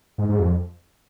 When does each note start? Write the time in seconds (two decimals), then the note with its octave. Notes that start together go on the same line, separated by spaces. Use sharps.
0.18 G#2
0.29 G#2
0.39 F2